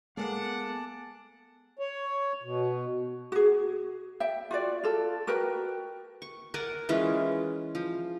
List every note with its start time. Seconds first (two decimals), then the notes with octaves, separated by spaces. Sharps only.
0.17 G#3 A#3 B3 A4 F#5 A5 D6
1.79 C#5
2.43 B2
3.32 F#4 G#4
4.20 E5 G5
4.51 F4 F#4 D5
4.83 F4 A4
5.27 F#4 A#4 B4 G5
6.22 C#6
6.54 A#4 D5 F#5 G#5
6.89 E3 G#3 C#4 F4
7.75 F3